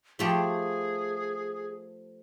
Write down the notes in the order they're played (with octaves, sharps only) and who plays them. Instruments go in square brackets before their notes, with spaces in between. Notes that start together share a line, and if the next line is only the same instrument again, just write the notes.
[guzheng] F3 A3 G4 [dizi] G#4